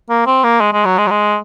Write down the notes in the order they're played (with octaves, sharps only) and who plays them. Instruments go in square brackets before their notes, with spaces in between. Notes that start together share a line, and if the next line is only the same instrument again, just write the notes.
[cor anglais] A#3
C4
A#3
G#3
G#3
F#3
G#3
F#3
G#3